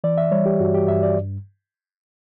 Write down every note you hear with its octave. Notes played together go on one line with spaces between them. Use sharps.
E3 D5
E5
G3 C#5
G4
G2 F#4
G4
G2 E5
D5